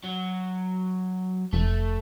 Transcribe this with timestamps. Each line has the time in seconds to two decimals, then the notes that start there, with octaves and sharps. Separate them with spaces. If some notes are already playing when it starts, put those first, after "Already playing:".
0.04 F#3
1.53 F1 A3